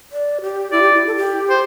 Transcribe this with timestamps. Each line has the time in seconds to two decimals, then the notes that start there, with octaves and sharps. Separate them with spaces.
0.12 D5
0.42 G4
0.72 E4 D5
0.82 G4
0.93 E4
1.07 A4
1.16 G4
1.50 C5